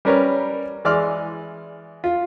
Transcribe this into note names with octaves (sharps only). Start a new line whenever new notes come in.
G3 C#4 A#4 B4 C#5
E3 G#3 D5 C6 D6 F6
F4